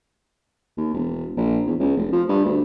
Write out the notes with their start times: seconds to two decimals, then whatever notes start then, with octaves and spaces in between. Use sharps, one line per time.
0.77 D#2
0.94 E1
1.37 A#1
1.66 E2
1.79 C#2
1.97 F1
2.13 F3
2.29 G2
2.45 D2